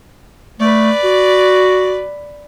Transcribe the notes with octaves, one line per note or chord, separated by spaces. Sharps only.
A3 B4 D5
F#4